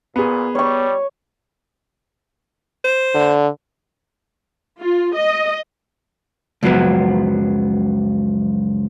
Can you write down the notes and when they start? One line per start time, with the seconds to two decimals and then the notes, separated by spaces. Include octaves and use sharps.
0.16 A#2 B3 G#4
0.55 G3 C#5 C#6
2.84 C5
3.15 D3
4.80 F4
5.16 D#5
6.63 C#2 F#2 F3 F#3 B3